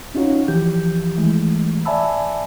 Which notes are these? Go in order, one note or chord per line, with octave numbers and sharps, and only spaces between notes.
C#4 D#4 F4 F#4 C#5
E3 F3 G4 G6
D#3 E3 G#3 A3
D5 E5 G#5 A5 B5 E6